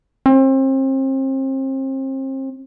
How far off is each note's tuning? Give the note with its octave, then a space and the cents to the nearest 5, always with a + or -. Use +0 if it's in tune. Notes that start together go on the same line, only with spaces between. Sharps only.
C4 +35